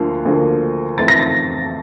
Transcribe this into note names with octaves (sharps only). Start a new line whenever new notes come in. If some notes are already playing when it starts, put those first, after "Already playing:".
Already playing: D2 D3 F3 A#3
D2 D3 F3 A#3
F2 E3 A3 A6
A#6
A6